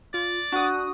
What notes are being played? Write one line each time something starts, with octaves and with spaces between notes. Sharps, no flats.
F4 D5
D4 F#4 F#5 D#6